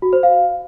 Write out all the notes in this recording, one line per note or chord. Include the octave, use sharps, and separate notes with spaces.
F#4
C5
F5